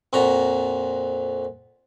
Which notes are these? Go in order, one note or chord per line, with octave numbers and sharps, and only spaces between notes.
F2 A#2 F#4 A#5